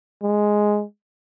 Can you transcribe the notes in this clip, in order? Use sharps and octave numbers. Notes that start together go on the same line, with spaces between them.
G#3